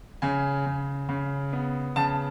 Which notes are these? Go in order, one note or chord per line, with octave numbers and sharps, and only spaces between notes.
C#3 G#5
C#3
C#3
B3
C#3 A5